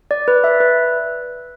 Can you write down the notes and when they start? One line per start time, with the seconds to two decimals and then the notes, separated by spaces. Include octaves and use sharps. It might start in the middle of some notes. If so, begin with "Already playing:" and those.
0.11 D5
0.28 B4
0.44 E5
0.60 B4